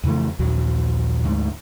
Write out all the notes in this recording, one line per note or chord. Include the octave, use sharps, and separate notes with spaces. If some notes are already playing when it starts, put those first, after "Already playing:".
F2 C#3 E3 A3
A#1 D#2 F#3
D2 G#2